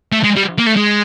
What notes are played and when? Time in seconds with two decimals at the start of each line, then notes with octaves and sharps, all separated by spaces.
0.12 A3
0.24 G#3
0.37 G3
0.59 A#3
0.67 A3
0.77 G#3